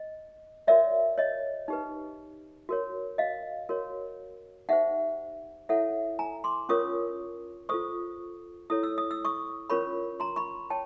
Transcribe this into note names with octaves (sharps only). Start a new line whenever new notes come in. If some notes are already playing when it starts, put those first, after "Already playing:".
Already playing: D#5
F#4 A#4 C#5 D5 E5
C#5 D#5
D#4 G4 B4
F#4 A#4 C#5
D#5 F5
F#4 A#4 C#5
D#4 G4 C5 E5 F#5
E4 A4 C#5 E5 F#5
G#5 A#5
C6 D6
C#4 F4 A#4 C#5 C#6 D#6
F4 A4 C5 C#6 D#6
E4 A4 C#5 D#6
E6
D#6
E6
C#6 D#6
C#4 F4 A#4 C#5 B5 C#6
A#5 C6
B5 C#6
C#5 G5 A5